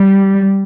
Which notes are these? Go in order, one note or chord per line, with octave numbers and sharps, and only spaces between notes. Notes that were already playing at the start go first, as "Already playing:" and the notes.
Already playing: G3